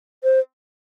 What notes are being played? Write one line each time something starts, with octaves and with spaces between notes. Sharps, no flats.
C5